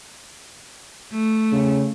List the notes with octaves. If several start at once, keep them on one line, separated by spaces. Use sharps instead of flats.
A3
C#3